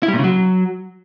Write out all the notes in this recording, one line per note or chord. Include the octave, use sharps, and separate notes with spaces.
E4
G3
A#2
C#3
F#3